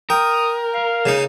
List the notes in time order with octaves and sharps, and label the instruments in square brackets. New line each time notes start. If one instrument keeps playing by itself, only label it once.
[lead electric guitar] A#4 [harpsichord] G5 [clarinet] D#6
[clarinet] F5
[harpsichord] C#3 A#3 D#4